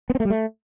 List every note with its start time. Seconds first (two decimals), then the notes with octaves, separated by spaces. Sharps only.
0.10 B3
0.15 C4
0.20 A3
0.25 G3
0.30 A3